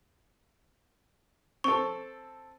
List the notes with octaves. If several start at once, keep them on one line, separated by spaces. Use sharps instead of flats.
C4 A4 C#6